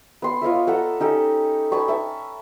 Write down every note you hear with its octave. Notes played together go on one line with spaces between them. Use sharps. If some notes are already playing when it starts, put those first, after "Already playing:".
B3 C6
F4 C#5 D#5 E5
A4 F#5 A#5 B5
C#4 D#4 G4 A4
G#5 A5 B5 C#6
E5 A5 C#6